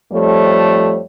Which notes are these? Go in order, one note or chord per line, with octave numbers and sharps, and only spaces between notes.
F2 F3 G3 A3 C#5